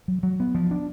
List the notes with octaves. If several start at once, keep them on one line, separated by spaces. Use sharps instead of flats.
F#3
F#3
B3
F3
D4